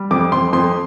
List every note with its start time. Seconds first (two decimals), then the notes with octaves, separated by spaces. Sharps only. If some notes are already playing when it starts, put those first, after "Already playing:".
Already playing: G3
0.11 F2 D6
0.32 F2 C6
0.53 F2 C6